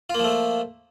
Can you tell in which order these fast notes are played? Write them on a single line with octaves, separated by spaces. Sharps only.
F4 A#3 F3 A3